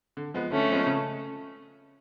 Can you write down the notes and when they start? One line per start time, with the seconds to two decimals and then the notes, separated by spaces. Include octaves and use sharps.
0.17 D3
0.34 F3 G#3 B3
0.52 D3 A3 C#4
0.70 F3 G#3 B3
0.86 C#3